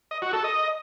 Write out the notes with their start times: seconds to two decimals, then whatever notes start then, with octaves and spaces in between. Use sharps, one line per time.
0.11 D#5
0.22 F#4
0.33 A4
0.44 D#5